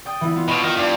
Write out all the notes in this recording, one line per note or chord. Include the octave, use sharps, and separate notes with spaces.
D5 G5 D#6
E3 B3 E4
B3 F4
B2
D#3
G2